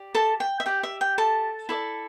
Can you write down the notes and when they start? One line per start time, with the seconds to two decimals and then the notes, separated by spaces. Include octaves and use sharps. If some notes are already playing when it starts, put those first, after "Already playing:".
Already playing: G4 D5
0.15 A4 A5
0.40 G5
0.60 E5
0.66 G4 D5 G5
0.83 E5
1.01 G5
1.18 A4 A5
1.69 E4 A4 D5